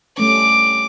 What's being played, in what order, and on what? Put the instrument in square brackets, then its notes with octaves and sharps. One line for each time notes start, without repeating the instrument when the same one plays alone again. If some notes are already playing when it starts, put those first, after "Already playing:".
[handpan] G3 A3 C#4 [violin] D6